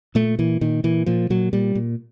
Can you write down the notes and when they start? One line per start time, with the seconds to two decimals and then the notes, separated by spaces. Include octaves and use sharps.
0.15 A#2 A3
0.39 A#2 E3
0.61 A#2 D#3
0.84 A#2 E3
1.06 A#2 F3
1.30 A#2 F#3
1.53 A#2 G3
1.75 A#2